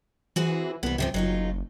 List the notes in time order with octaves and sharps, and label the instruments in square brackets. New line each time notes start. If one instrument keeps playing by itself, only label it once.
[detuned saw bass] E3 [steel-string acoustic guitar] C4 F#4 G#4
[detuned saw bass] C2 [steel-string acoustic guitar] E3 B3
[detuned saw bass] C#2 [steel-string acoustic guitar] C3 F3 C4
[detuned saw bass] F#1 [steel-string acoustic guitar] F#3 D#4 F4